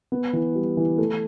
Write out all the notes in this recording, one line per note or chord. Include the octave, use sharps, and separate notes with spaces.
B3
E3
G3
E3
A3